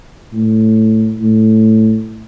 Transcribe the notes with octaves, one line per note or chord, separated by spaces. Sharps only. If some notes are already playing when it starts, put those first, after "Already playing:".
A2
A2